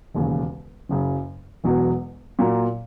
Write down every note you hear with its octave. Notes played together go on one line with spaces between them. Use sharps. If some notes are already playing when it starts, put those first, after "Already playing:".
E1 D#2 C#3
F#1 F#2 C#3
E1 E2 B2 F#3
A#2 F#3 A#3